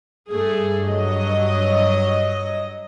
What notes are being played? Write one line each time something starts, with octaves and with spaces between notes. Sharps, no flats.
G2 A3 G#4
F#3 D#5